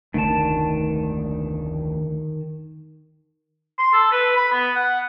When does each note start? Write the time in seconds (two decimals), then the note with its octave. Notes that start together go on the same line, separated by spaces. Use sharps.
0.14 F1 D2 D#3 A3 A5
3.78 C6
3.93 A4
4.12 B4
4.36 B5
4.52 B3
4.75 F#5